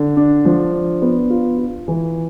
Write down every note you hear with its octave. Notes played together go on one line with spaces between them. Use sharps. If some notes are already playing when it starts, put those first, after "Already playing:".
Already playing: D3
D4
F3
D4
B3
F4
F4
E3